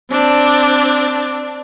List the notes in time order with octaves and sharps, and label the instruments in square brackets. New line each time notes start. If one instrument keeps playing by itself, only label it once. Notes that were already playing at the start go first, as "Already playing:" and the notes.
[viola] C4 D4